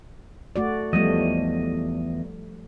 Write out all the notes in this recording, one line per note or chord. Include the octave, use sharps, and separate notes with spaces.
A3 F#4 D5
E2 F3 G3 A3 D#5